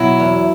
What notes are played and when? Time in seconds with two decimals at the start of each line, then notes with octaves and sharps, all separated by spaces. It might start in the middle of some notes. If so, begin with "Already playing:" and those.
Already playing: B2 F#3 E4
0.20 E2